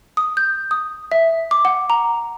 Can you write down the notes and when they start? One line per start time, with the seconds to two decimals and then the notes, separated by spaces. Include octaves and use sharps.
0.17 D#6
0.37 G6
0.71 D#6
1.12 E5
1.51 D6
1.65 F#5
1.90 A#5